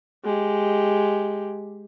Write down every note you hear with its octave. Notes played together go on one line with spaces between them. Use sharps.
G#3 G4